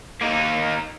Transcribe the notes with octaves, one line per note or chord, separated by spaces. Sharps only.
A#3 D#4